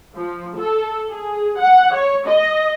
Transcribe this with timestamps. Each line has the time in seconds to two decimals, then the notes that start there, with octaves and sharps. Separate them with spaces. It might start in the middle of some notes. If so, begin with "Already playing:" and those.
0.14 F3
0.57 A4
1.11 G#4
1.58 F#5
1.93 C#5
2.27 D#5